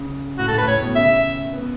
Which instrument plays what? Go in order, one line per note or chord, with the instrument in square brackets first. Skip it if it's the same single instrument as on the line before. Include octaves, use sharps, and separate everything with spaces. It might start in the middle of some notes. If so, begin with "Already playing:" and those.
Already playing: [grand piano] C#3
[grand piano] A2 [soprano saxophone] F#4
[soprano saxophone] A4
[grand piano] A2 [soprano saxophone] B4
[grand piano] A2 [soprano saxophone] C#5
[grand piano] B2
[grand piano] C#3 [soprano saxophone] E5
[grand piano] B3